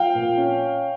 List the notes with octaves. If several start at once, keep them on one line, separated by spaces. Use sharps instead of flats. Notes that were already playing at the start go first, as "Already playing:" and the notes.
Already playing: F3 F5 G5
A#2
C#4